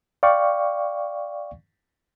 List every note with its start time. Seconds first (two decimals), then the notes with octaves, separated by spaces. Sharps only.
0.23 D5 F5 G5 C#6